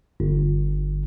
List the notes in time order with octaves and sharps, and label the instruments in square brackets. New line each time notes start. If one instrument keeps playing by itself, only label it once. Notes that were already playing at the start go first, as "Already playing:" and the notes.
[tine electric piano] G1